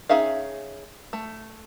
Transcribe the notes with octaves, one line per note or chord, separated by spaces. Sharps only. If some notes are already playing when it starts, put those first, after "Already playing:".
C#4 D#4 G#4 E5 F5
A3